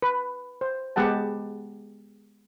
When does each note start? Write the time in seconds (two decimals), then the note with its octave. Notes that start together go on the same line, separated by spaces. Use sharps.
0.02 B4
0.61 C5
0.96 G#3 B3 G4 F#5 A5